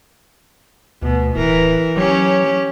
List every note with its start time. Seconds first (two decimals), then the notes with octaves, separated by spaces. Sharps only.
1.02 D2 B2
1.36 D1 E3 A#4
1.97 F#3 C#4 G4 C#5